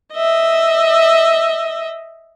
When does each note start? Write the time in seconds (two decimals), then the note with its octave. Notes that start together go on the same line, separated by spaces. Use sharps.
0.14 D#5 E5